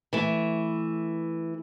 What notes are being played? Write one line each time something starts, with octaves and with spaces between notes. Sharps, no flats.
E3 A3